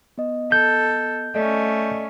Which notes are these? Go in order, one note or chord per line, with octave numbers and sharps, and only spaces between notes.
B3 D#5
A4 G6
A3 C#4 A4 D5 D#5